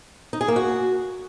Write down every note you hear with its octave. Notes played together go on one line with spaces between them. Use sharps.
D#4
G#4
A#3
F#4